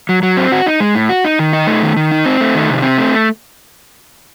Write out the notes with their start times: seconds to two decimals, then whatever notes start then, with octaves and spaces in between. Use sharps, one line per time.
0.09 F#3
0.23 F#3
0.37 C4
0.52 F#4
0.66 D#4
0.80 G#3
0.95 A2
1.09 F#4
1.25 D#4
1.39 D#3
1.53 D#4
1.67 A3
1.83 D#3
1.97 D#3
2.11 D#4
2.26 C4
2.40 A3
2.55 D#3
2.69 C3
2.83 C4
2.97 A3